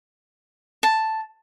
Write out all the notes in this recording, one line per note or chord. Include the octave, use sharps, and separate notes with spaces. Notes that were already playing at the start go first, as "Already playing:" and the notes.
A5